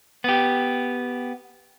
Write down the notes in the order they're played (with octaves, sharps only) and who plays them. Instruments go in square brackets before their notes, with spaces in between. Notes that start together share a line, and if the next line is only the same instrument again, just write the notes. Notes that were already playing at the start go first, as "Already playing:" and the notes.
[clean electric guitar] B3 G4